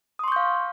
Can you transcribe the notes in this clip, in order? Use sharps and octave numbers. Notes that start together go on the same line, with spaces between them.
F5 C6 C#6 D#6 G6